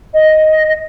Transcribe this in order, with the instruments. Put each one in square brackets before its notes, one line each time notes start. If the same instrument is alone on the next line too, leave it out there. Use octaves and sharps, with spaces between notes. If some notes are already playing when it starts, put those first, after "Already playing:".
[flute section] D#5